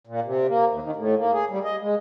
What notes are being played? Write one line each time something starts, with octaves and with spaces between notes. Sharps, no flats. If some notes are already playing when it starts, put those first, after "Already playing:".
A#2
C3
A#3
D#2
D#3
A2
A#3
G#4
G3
D#5
G#3